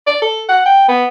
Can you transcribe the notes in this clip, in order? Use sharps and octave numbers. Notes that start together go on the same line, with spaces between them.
D5
A4
F#5
G5
B3